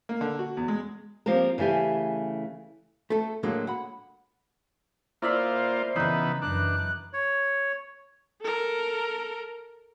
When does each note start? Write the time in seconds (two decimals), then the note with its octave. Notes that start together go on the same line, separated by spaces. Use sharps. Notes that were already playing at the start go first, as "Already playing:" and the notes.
0.09 A#3
0.21 D3
0.39 F#4
0.57 E2
0.68 G#3
1.26 F3 A#3 C4 G4 A#4
1.58 C#3 E3 A3 G4 G#5
3.10 A3 A4
3.43 A2 D3 F#3 G#3 A#3
3.67 F#5 B5
5.22 A#3 E4 F4 C5 D5 E5
5.96 C#3 E3 B3 D#4 B4
6.42 F#2 E3 D4 F#6
7.13 C#5
8.41 A4 A#4